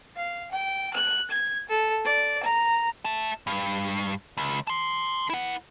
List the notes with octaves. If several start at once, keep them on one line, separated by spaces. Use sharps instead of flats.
F5
G5
F#6
G#6
A4
D5
A#5
E5 A5
G2
C#2
A5 C6
E4 F#5